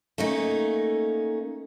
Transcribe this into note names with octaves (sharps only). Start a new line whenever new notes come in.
A3 A#3 C#4 D#4